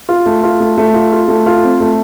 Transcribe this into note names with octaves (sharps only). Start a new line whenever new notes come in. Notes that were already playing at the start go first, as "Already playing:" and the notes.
F4
A3
F4
A3
A3
F4
F4
A3
F4
C4
A3